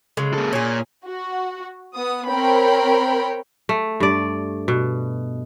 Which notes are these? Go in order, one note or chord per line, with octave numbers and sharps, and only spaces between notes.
C#3 F#3 G#3
A#3 A4
A#2 C#4 G#4
F#4
B3 D#6
C4 A#4 C#5 G5 B5
A3
G2 D5
B2